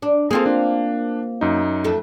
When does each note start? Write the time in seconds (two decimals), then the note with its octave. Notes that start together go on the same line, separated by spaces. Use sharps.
0.02 D4
0.31 A#3 C4 F4 G#4 A4
0.46 D4
1.41 F#2 D#4
1.84 F2 A3 A4